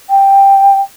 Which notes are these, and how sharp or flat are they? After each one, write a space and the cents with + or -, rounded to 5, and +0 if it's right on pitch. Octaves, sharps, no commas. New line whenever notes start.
G5 +5